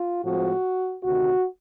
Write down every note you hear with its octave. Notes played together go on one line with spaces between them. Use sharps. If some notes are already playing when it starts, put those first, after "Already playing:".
Already playing: F4
A2 F3 G#3 C4 F#4
D2 C3 D#3 F#4